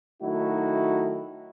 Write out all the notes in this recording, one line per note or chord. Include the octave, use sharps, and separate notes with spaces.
D#3 F#3 A3 D#4 E4 F#4